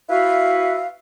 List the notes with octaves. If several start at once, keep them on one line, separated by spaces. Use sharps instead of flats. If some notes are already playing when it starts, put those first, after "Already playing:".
E4 F#4 B4 E5 F5